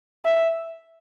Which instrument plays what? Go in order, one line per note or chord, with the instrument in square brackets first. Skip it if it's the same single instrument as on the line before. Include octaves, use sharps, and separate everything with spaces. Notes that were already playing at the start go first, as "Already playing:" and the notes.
[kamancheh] E5